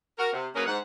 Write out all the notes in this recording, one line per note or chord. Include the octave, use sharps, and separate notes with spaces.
F#4 A#4
C3
F#3 A#3 C#4 G#4 A#4 B4
G#2 F#5